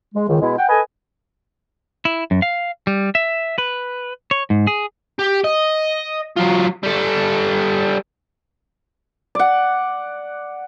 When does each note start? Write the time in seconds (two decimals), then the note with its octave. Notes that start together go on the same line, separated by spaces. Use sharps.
0.15 G#3
0.29 C#2 D#3
0.41 B2 G#3 E4
0.58 F#5 G5
0.69 A4 B4 D#5 G#5
2.05 E4
2.31 F#2
2.42 F5
2.87 G3
3.15 E5
3.58 B4
4.31 C#5
4.50 G#2
4.67 G#4
5.19 G4
5.44 D#5
6.36 F#3 F4
6.83 G3 A4
9.35 D5 F#5